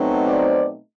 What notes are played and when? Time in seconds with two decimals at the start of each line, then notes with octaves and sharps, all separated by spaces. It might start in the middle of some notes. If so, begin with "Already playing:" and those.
Already playing: B2 F#3 A3 C4 D#4
0.26 C5 D5